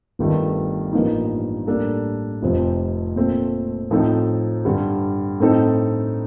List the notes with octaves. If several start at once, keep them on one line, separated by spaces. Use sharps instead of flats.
G1 G2 D#3 A3
A1 G2 F3 A#3 D#4
A2 G3 A#3 D4 A4
F1 F2 C3 F3 C4
A#2 A3 C4
A2 F3 C4 D#4 A4
G2 D3 G3
A2 A3 C4 D#4 A4